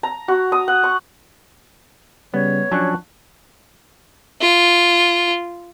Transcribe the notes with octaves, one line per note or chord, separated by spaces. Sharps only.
A#5
F#4
D#6
F#5
C#6
C#3 G3 B3 C#5
F3 F#3 C#4 D4 A5 C#6 F#6
F4